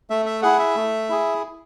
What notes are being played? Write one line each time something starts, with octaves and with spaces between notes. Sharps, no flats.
A3 E5
E5
E4 G#4 F#5
E5
A3
E4 G#4